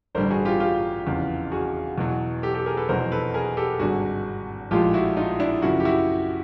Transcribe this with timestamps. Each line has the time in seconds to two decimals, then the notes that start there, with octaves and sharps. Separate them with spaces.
0.15 A1 G2 D3 G3 A#4 C5
0.30 F#4 G#4
0.45 F4 G4
0.60 F4 G4
1.06 F1 E2 C#3
1.52 F#4 G#4
1.98 E2 B2 F#3
2.43 G4 A4
2.54 G4 A4
2.66 G#4 A#4
2.77 A4 B4
2.89 F1 E2 B2 F#3 A#4 C5
3.12 A4 B4
3.34 G#4 A#4
3.57 G4 A4
3.80 G#1 G2 D3 F#4 G#4
4.71 A#1 A2 F3 G#3 F4 G4
4.94 E4 F#4
5.16 D#4 F4
5.40 D4 E4
5.62 F#2 C#3 F3 E4 F#4
5.80 G4
5.85 E4 F#4